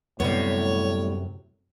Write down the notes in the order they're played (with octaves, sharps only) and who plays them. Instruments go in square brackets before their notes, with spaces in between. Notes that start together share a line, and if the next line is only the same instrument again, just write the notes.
[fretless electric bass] F#2 C3 [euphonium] A2 [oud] G3 B3 [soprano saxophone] C#5